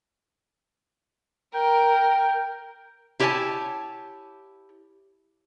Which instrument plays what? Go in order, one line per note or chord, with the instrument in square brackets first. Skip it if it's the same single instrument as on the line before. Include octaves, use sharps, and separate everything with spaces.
[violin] A#4 [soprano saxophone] G5
[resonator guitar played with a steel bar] E4 G4 C#5 D#5 G#5 A5